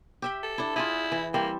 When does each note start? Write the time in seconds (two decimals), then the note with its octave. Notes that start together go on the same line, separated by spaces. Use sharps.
0.22 G4 E5 G5
0.43 A4
0.58 D4 E4
0.76 E4 F4 G#4 D#5
1.12 E3
1.34 G3 A#3 C4 E5